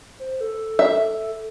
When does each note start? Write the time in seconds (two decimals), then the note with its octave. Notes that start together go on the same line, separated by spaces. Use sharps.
0.19 C5
0.41 A4
0.79 E5